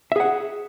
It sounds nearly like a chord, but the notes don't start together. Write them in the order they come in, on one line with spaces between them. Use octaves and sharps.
E5 G#4 F#5